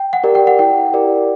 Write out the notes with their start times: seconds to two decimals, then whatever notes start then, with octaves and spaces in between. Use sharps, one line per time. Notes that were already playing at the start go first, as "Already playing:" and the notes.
Already playing: G5
0.13 F#5
0.24 G4 A#4 D5
0.35 G5
0.47 F#5
0.59 E4 G5
0.93 G4 A#4 D5